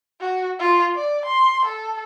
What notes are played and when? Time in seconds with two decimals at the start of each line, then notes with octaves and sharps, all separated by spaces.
0.21 F#4
0.59 F4
0.95 D5
1.26 C6
1.65 A4